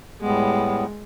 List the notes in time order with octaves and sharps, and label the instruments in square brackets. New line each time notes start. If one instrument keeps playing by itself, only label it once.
[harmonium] A2 G3 B3 [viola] G#3